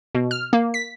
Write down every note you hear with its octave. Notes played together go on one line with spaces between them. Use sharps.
B2
F6
A#3
B6